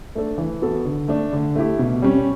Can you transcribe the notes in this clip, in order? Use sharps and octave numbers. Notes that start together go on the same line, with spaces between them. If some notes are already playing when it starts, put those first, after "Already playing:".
A3 D4 A4
E3
B3 F#4 A4
D3
A3 D4
D3
A3 E4 G4
B2
G3 C#4